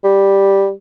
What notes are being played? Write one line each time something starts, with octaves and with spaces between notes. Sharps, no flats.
G3